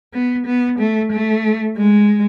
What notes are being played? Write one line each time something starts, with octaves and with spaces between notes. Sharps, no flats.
B3
B3
A3
A3
G#3